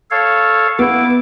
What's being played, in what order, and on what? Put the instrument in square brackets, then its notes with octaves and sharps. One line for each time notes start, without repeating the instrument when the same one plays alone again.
[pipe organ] A4 C#5 F5
[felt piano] B3 [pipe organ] E4 D6